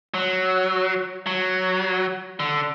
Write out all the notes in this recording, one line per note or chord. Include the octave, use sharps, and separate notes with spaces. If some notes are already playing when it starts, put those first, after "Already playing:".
F#3
F#3
D3